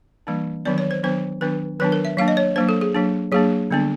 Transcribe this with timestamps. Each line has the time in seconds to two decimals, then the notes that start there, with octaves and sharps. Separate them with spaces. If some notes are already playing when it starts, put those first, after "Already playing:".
0.27 E3 G3 A#3 D4
0.65 D#3 F#3 B3 D4 D5
0.78 C#5
0.91 C5
1.03 D#3 F#3 B3 D4 C5
1.41 D#3 F#3 B3 D4 B4
1.80 D#3 F#3 B3 D4 B4
1.92 A#4
2.05 E5
2.17 F#3 A#3 D4 F5
2.28 D#5
2.37 C#5
2.56 F#3 A#3 D4 C5
2.69 A4
2.81 G#4
2.95 F#3 A#3 D4
3.32 F#3 A#3 D4 G#4
3.71 D3 G3 B3 D4